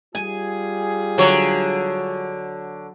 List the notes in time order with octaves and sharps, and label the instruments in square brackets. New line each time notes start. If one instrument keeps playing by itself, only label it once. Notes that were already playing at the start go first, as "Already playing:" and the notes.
[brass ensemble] G3 F4 G#4 [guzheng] G#5
[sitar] D3 C#5 [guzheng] F#3